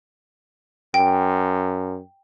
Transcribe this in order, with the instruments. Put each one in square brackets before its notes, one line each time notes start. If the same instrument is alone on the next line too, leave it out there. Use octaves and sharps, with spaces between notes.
[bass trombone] F#2 [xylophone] G5